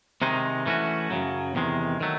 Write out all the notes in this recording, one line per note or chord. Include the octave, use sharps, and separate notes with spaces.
C3 D#3 G#3 D#4
E3 A3 C#4 F#4
F#2 C#3 F#3
E2 C3 D#3 G#3
D#3 F#3 A3